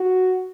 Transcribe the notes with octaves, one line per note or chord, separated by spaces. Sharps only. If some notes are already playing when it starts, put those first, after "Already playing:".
Already playing: F#4